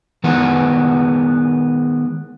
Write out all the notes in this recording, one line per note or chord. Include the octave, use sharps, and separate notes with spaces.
D#3 G#3 B3 F#5